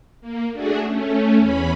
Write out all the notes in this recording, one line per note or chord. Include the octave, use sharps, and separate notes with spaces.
A#3
A3 D4 F#4 G#4
A3 C#4
E2 C#4 B5